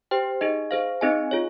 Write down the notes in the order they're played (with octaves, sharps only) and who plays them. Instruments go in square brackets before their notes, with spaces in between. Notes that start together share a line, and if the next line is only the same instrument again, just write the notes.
[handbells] G4 C5 G5
D#4 G#4 D#5
G#4 C5 F5
C4 D#4 G#4 D#5 G#5
F4 G#4 C#5